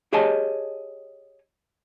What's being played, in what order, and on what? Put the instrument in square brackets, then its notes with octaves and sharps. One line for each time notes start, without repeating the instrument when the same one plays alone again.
[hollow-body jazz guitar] G4 G#4 C#5 D#5 G#5 A5